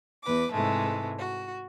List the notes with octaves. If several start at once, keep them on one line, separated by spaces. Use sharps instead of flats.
E2 B4 D6
G#2 C3 E3 G#3 A3
F#4